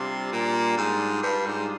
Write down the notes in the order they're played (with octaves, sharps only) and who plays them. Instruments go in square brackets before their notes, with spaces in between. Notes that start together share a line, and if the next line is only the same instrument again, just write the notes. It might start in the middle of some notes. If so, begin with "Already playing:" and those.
Already playing: [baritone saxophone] C3 [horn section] G3 D4 F4
[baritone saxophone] A#2
G#2
G2
G#2